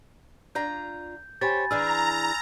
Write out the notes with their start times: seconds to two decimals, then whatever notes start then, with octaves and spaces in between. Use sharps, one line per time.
0.55 D4 F4 A#5 G6
1.41 G4 C5 C#5 G#5 B5 A6
1.71 E3 D4 G#4 A#5 E6 F6 G6